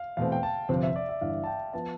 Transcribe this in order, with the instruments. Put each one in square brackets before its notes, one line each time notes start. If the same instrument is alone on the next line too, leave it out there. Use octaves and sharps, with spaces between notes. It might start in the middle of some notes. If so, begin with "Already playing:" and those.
Already playing: [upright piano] F5
[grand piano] E2 B2 A3 C4 [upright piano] F5
[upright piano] G5
A5
[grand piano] G1 F2 C3 F3 C4
[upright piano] E5
D5
E5
[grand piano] G1 G2 E3 [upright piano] F5
[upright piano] A5
G5
[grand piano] F3 B3 [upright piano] A5